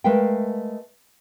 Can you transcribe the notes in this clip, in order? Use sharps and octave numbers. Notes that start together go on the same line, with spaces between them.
G#3 A3 A#4 B4 F5 G5